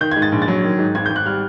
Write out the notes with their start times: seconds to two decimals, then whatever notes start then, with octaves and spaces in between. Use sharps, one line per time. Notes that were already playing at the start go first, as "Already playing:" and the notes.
0.01 D#3 G6
0.11 G#6
0.16 G#2
0.22 A6
0.32 A#1
0.42 A6
0.48 F#3
0.63 D#3
0.79 G#2
0.95 G#1 G#6
1.06 G6
1.10 G#1
1.16 F#6
1.25 G3 F6